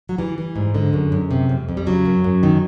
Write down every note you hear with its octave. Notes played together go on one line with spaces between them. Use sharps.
F#3
E3 G3
E3
G#2
D3 G#3
F#2
F#2
C3
F2
F2
G3
C#3 F#3
F#2
F#2
D#3